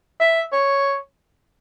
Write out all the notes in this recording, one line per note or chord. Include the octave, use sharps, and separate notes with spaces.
E5
C#5